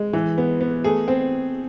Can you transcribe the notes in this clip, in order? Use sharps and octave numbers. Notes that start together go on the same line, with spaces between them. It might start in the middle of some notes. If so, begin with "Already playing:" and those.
Already playing: G#3
E3
B3
B3
A3 G#4
C4